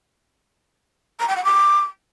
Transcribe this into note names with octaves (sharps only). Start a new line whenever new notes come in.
A#5
G5
F#5
D6